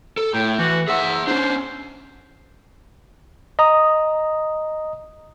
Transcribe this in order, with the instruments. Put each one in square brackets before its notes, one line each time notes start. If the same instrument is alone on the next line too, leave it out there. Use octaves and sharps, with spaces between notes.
[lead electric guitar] A4
[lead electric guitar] A2 [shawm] G5
[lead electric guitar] E3 [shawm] F#4
[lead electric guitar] G#4 F#5 [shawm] E5
[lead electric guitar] C#4 D4 [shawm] C5
[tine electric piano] D#5 A#5 D#6